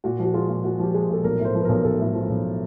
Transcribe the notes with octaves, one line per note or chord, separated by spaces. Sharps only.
A#2 F#4
F3
F#4
G#3 F4
A#2
A#2 F#4
F3 G4
G#3 G#4
A#2 A4
B1 A#4
A2
C5
F3
B4
B1 A#4
B1 A4
A2
F3
B1